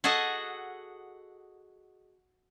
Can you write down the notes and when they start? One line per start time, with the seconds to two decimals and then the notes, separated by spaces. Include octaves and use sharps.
0.04 F#4 G#4 A4 D#5 F#5